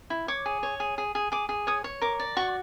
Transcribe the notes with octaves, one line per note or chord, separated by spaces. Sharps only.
E4
C#5 D6
G#4
C#5
G#4
G#4
G#4
G#4 D6
G#4
C#5 D#6
C#5
A#4 D6
D5
F#4 C#6